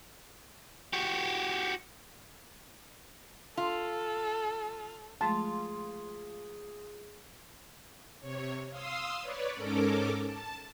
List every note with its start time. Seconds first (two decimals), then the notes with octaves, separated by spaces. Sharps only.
0.93 F#4 G4
3.57 F4 A4
5.21 F3 G#3 A3 F4 G#4 A5
8.20 C3 C#5
8.70 F5 C6 D#6 E6
9.20 B4 C#5 D5
9.54 G#2 C#4 A4 A#4 D6
10.23 A5